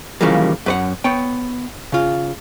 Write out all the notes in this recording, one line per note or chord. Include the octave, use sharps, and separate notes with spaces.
D#2 C#3 E3 F3 G3 A#3
F#2 B4 F#5
B3 C#5 G5
C#3 F4